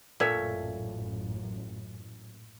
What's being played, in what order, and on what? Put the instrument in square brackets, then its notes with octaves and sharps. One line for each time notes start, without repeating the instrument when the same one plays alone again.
[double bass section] A1 F#2 [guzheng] A#2 [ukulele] A4 C#5 E5